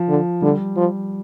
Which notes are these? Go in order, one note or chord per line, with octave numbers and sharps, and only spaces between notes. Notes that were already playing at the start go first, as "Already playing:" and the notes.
Already playing: F3
D3
D3 G3
F3